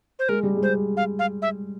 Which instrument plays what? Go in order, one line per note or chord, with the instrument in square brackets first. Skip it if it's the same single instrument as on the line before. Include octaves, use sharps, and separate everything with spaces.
[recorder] C5
[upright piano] G#3 [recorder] A#4
[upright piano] G3
G#3
[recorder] C5
F5
F5
E5